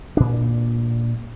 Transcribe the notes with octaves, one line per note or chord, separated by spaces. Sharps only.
A#2 D4